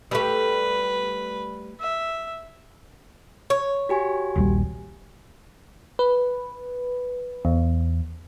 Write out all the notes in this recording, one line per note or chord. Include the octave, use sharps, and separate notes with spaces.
G3 A3 B4
E5
C#5
F#4 G4 G#5
D#1 A#1 G3
B4
E2